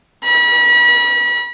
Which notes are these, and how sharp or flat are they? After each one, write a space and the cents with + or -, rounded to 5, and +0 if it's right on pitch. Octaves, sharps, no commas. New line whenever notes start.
B5 -35